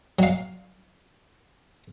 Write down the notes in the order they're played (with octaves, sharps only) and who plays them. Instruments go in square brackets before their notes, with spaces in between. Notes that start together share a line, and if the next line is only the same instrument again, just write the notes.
[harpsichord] F#3 F5